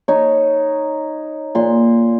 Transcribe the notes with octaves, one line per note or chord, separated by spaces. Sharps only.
D#4 C#5
A#2 C6